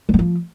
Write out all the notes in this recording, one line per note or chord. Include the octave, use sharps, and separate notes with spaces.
G3
G#3
F3